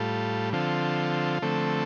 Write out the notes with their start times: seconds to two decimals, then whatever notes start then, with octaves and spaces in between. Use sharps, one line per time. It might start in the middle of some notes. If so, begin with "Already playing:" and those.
Already playing: A2 G3 F4 A4
0.53 D3 F3 C4 F4 A4
1.42 D3 F3 A3 C4 A4